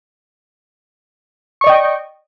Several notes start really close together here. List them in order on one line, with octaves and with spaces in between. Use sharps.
C#6 D5 D#5 G5